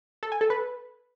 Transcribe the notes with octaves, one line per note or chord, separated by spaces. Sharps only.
A4
G#5
A4
B4